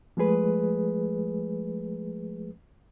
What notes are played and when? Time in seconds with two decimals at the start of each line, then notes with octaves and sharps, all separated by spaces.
0.17 F3 G#3 A3 G#4 B4